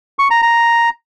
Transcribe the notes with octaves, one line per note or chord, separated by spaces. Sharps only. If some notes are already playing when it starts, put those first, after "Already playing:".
C#6
A#5
A#5